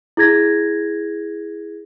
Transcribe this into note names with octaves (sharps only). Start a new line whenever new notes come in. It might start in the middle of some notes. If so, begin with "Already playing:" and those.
E4 G#4 G#6 A#6